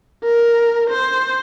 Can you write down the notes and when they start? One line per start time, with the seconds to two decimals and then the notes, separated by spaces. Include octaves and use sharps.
0.24 A#4
0.90 C5